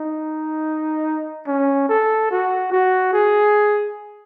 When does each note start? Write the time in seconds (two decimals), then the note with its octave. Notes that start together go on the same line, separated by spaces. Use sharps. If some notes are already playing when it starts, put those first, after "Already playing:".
Already playing: D#4
1.47 C#4
1.89 A4
2.31 F#4
2.72 F#4
3.13 G#4